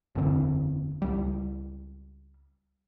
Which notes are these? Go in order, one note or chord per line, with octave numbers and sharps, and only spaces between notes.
F#1 E2 D3 C4
C#2 G3